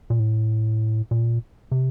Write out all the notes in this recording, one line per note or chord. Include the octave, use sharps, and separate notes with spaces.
A#2
A2
A#2
C3